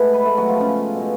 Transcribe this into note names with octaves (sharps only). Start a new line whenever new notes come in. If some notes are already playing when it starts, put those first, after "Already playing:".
Already playing: B2 G#3 A3 B3 A4
B4
A3 A4
F#3 F#4
F3 F4
C#3 C#4
B2 G#3